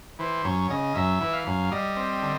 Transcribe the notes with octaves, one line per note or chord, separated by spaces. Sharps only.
E3 C5
F#2 C#5
C#3 D#5
F#2 E5
E3
F5
F#2
G3 D#5
C4
D3